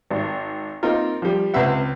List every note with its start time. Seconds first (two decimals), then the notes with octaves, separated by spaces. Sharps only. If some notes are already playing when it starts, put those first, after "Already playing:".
0.10 G#1
0.83 A#3 C4 D#4 F4 A#4
1.22 F3 G3
1.54 C#2 C4 B4 E5 F#5